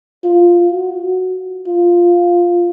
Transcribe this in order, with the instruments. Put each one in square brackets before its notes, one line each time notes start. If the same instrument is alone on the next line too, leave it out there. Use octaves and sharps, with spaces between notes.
[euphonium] F4
F#4
F4